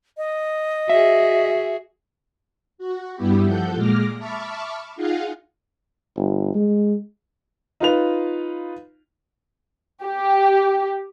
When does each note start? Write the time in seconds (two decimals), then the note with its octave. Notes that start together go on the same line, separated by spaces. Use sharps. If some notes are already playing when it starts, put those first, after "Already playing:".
0.17 D#5
0.89 F#4 G#4 E5
2.78 F#4
3.15 G2 G3 B3 E4 G4
3.45 F3 A4 F#5 G6
3.76 A#2 G#3 D6 F6 A#6
4.18 E5 A5 B5 C#6 D6 F6
4.96 D#4 F4 G#4 F5 F#5
6.17 G1
6.55 G#3
7.80 D#4 F4 B4 F7
10.04 G4